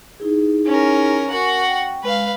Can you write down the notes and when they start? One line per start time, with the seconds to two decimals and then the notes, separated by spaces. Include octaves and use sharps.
0.20 D#4 E4 G#4
0.66 C#4 A#4
1.30 F#4 A#4 F#5 G#5
1.67 G5
2.04 G#3 B4 F5